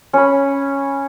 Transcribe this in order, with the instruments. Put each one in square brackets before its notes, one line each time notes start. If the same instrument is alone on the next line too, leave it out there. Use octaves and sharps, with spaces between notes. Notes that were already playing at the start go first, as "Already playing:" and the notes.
[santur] C#4 B5